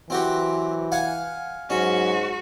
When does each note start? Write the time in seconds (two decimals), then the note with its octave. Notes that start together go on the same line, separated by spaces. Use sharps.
0.10 E3 F#3 C4 F#4 G4
0.92 F5 F#5 G#5
1.70 G#2 F#3 C#4 F#4